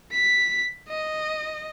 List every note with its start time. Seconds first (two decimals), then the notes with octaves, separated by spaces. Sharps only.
0.12 B6
0.89 D#5